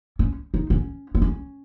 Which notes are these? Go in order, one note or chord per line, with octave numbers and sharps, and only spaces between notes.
C#4
D#4
C#4
B3
C#4